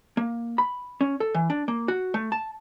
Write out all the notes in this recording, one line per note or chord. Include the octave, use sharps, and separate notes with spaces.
A#3
B5
C#4
A4
E3
D4
A#3
F#4
A3
A5